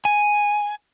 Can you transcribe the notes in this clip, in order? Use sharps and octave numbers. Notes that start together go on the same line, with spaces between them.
G#5